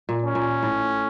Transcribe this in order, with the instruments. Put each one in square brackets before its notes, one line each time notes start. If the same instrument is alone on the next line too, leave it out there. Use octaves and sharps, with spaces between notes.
[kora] A#2
[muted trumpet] C#4
[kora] A#2
A2